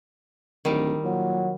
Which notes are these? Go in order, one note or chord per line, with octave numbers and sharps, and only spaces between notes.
D1 D#3 G3 D#4
A#2 F#3